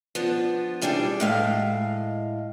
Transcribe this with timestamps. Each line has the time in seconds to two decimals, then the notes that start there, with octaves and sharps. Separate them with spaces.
0.15 F3 B3 D4
0.82 E3 G3 D4 G4 G#4
1.20 A2 G#3 F5